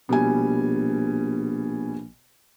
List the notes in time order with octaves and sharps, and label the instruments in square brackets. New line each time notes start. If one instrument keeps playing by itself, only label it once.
[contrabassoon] A#1 [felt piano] B2 G3 G#5